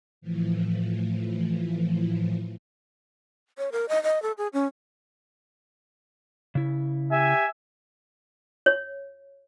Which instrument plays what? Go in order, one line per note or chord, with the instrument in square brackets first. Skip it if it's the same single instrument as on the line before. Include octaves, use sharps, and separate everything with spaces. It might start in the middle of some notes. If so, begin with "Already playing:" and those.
[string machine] A2 E3 F3
[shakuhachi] C#5
A#4
D#5
D#5
A4
G#4
C#4
[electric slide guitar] C#3 E4
[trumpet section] G4 E5 G#5
[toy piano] C#5